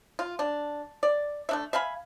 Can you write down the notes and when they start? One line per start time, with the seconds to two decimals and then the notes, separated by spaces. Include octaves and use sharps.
0.19 F4
0.39 D4
1.03 D5
1.49 A3 D4 E5
1.73 E5 F5 G#5 B5